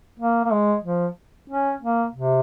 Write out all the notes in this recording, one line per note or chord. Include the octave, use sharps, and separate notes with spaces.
A#3
A#3
G#3
F3
C#4
A#3
C3